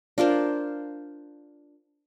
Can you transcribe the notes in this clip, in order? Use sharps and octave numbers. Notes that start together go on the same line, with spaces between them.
D4 F4 A#4 C5